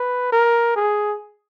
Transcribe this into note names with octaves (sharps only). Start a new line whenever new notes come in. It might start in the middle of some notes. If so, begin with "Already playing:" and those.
Already playing: B4
A#4
G#4